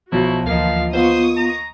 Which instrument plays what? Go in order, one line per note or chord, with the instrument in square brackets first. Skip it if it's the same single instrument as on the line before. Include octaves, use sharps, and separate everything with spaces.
[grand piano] B1 B2 F3 [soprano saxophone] E4 [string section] F#4
[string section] D2 E3 F3 [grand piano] A#3 D#5 [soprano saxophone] F5
[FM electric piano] B3 F4 [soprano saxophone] C5 [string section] C#6 D#6
[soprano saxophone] A#5